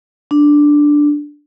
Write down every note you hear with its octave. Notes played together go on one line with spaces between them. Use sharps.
D4